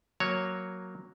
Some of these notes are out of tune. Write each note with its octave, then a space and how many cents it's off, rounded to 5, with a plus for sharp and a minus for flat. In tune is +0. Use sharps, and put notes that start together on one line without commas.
F#3 +0 A#3 +0 C#5 +0